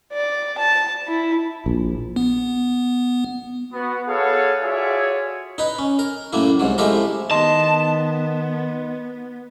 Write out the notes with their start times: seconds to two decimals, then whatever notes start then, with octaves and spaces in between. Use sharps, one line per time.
0.13 D5
0.59 A5
1.08 E4
1.66 A#1
2.16 B3
3.73 B3 F#4
4.08 B3 G#4 A4 C#5 F5 F#5
4.62 F4 F#4 G#4 C#5 D5 E5
5.58 D#4 B4
5.79 C#4
5.99 A#4
6.33 F#2 A2 A#3 E4
6.59 C2 G#2 F#3
6.78 F3 G#3 A3 E4 G4 A#4
7.31 D#3 B3 D#5 A5 C6